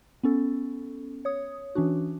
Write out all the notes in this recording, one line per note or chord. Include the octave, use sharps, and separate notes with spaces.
B3 C#4 A4
C#5 D#6
E3 C#4 D4 F#4